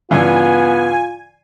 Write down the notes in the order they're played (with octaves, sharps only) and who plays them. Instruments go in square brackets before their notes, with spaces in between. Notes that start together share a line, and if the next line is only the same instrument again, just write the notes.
[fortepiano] G2 C#3 E3 [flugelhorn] B3 [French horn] F4 [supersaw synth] G#5